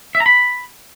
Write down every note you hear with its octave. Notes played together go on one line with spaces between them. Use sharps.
E5
A#5
B5